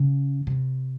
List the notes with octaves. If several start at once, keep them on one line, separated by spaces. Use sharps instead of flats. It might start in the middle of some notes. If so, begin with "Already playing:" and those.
Already playing: C#3
C3